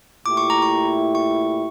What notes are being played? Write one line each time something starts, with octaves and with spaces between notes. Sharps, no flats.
A#2 A3 E4 G4 D6
C#6
A#5
C#6
C#6